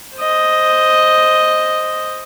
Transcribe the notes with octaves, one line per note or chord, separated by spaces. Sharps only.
C5 D#5